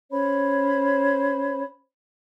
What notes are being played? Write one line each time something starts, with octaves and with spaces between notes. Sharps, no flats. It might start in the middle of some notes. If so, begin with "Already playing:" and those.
C#4 C5 C#5 B5